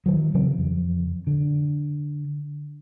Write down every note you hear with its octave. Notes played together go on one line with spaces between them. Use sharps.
D#3 E3 F#3
C#3 E3 F#3 C4
F2
D3